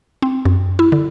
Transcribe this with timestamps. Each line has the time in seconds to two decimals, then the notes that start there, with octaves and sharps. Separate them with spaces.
0.22 C4
0.45 F#2
0.79 E4
0.92 D3